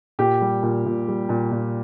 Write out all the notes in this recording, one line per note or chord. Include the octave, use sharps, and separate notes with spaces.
A#2 G4
G3
A#2
A#2
G3
A#2
A#2